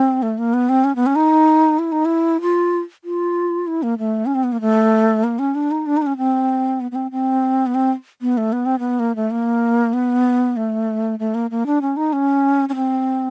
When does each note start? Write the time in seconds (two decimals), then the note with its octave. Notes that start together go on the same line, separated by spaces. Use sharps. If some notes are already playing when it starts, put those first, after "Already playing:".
Already playing: C4
0.22 A3
0.38 A#3
0.54 B3
0.69 C4
0.84 C#4
0.96 B3
1.06 C#4
1.16 D#4
1.79 E4
1.92 D#4
2.05 E4
2.41 F4
3.04 F4
3.67 E4
3.83 A#3
3.98 A3
4.26 C#4
4.35 C4
4.44 B3
4.53 A#3
4.61 A3
5.24 A#3
5.39 C#4
5.55 D4
5.71 D#4
5.86 D4
5.97 D#4
6.02 D4
6.07 C#4
6.17 C4
6.81 B3
6.91 B3
6.95 C4
7.11 C4
7.67 B3
7.75 C4
8.21 B3
8.37 A3
8.53 B3
8.66 C4
8.79 B3
8.99 A#3
9.16 A3
9.31 A#3
9.93 B3
10.57 A3
11.19 A3
11.34 A#3
11.51 A#3
11.66 D4
11.82 C#4
11.97 D#4
12.13 C#4
12.69 C#4
12.76 C4